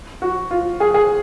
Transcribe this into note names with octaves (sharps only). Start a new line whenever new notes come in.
F#4
F4
G#4
G#4